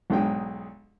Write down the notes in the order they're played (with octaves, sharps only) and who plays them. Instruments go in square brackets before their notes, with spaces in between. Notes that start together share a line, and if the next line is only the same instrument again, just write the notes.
[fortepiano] B1 G#2 D4 G#4 G5